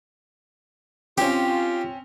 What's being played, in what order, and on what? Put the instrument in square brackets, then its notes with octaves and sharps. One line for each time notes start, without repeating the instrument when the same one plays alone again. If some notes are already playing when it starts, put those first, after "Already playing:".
[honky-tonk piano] C4 C#4 [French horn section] F4 [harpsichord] G4